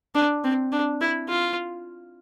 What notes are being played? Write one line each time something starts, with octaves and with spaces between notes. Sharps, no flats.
D4
C4
D4
E4
F4